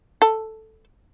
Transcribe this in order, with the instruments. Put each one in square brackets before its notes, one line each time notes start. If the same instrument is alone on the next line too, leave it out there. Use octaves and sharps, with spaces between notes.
[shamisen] A4